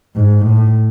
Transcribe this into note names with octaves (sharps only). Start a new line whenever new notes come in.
G#2
A2